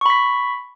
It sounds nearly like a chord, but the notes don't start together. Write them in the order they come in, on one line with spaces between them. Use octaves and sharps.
C#6 B5 B6